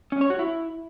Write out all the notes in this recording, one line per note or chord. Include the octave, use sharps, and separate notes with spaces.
C#4
C#5
F#4
E4